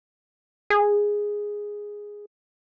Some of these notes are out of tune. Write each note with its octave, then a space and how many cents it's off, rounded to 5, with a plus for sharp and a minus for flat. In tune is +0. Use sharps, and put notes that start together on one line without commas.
G#4 -5